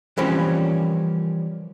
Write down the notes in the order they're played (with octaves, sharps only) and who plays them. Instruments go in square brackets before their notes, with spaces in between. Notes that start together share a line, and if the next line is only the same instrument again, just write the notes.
[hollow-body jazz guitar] E3 F3 G3 A#3 C4 C#4